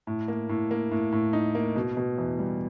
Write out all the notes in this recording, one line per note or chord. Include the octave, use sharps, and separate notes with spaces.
A2
A#3
A2
A#3
A2
A2
D#4
A#3
B2
B2
E2
G3